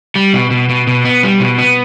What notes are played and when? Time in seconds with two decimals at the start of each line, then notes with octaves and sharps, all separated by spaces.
0.15 G3
0.33 B2
0.51 B2
0.69 B2
0.87 B2
1.05 B3
1.23 G3
1.40 B2
1.59 B3